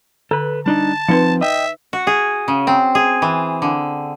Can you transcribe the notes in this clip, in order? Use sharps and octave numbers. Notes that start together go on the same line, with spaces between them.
D3 A4 B4
G3 D4 D#4 A5
F3 A#3 C4 D#4 B4
D#5 E5 G5
F#4
G#4
C#3
C4
G#4
E3
D3